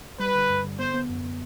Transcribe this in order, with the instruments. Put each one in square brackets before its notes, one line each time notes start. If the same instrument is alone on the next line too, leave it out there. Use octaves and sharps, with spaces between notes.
[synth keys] G3 [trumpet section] B4
[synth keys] D3
G2
D3
[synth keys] B3 [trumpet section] C5
[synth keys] B3
F#2